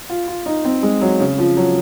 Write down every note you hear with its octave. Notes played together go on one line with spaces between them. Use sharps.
F4
F4
D#4
C4
G#3
F#3
C#3
F3
F#3